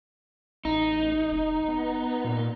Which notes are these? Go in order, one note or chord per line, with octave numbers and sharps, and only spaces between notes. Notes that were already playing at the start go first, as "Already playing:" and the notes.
A1 D#4
F1
B3
A#2